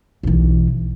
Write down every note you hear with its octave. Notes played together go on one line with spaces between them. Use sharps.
B1 E3